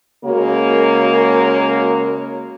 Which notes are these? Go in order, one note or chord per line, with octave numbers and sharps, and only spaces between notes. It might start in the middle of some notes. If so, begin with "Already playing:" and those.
C#3 G#3 A#3 F#4 A#4 C#5